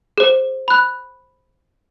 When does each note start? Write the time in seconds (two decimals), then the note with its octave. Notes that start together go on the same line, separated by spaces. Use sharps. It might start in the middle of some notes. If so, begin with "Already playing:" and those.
0.18 G#4 C5
0.68 B5 F#6